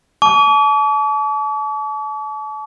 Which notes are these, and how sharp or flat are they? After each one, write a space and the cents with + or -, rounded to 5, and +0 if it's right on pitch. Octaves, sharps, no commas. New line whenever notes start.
A5 -35 D6 -45